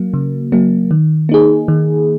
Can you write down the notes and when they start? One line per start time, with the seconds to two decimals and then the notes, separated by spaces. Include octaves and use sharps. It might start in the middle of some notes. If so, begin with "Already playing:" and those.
Already playing: F#3 A#3
0.14 C#3
0.52 F#3 A#3
0.91 D#3
1.29 A#3 D#4 G#4
1.68 D#3